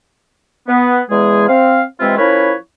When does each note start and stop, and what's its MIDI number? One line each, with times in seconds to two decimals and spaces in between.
0.68 1.00 59
1.10 1.46 40
1.10 1.46 56
1.10 1.46 68
1.48 1.82 60
1.48 1.82 77
2.00 2.15 48
2.00 2.15 52
2.00 2.15 56
2.00 2.15 60
2.00 2.15 64
2.00 2.15 65
2.18 2.53 53
2.18 2.53 61
2.18 2.53 64
2.18 2.53 70
2.18 2.53 71
2.18 2.53 73